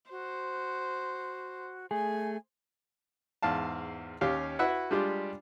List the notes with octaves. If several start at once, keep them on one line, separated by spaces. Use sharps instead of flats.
F#4 C5
A3 G#4 G#5
E2 G#2 F5 A5
D#2 C#4 G4 F5
E4 F#4 B4 E5 F#5
G3 G#3 D4 F4 G4